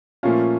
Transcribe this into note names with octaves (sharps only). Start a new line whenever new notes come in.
A#2 F3 A3 C#4 F4